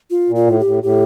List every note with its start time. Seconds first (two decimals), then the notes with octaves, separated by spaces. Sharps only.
0.10 F4
0.29 A#2
0.36 F4
0.47 A2
0.60 G4
0.65 A2
0.83 A2 G4